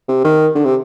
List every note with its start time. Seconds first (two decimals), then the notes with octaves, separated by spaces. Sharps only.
0.09 C3
0.25 D#3
0.55 D3
0.65 C3